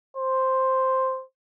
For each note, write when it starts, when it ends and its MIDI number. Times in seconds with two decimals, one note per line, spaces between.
0.17 1.24 72